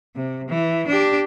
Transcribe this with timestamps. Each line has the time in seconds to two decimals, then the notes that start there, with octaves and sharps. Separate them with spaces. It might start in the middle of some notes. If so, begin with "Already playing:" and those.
0.16 C3
0.48 E3
0.88 D4 G4